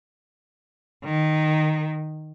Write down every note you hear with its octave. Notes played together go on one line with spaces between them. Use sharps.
D#3